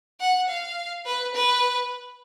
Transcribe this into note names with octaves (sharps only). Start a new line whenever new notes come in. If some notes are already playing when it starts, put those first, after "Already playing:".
F#5
F5
B4
B4